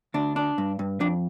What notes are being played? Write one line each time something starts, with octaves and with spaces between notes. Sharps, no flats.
D2 D4
D4
G2
G2
F2 D4